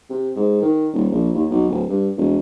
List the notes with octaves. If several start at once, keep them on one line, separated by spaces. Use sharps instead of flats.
C3
G#2
D#3
D#1
A#1
D#2
B1
D1
G2
E1